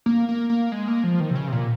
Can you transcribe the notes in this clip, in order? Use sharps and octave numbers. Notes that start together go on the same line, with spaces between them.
A#3
A#3
A#3
G#3
A#3
F3
D#3
C3
C#3
C3
A#2